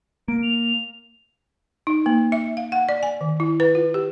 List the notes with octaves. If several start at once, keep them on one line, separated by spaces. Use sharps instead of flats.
A#3 D7
F7
D#4
A#3
E5
F5
F#5
D5
G#5
D#3
E4
B4
F4
G4